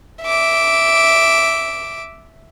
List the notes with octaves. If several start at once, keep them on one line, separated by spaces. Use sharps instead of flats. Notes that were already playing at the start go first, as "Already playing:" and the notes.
E5 D6